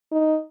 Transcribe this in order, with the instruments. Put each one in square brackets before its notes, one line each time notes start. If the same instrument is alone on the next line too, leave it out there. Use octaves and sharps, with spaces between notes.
[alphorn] D#4